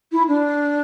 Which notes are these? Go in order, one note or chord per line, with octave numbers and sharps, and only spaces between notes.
E4
D4